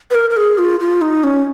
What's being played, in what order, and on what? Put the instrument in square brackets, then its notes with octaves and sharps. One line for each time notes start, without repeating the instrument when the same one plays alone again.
[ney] B4
A#4
A#4
G#4
F4
F4
D#4
C#4